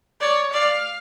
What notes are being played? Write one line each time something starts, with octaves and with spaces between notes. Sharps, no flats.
C#5 D5
D5 F5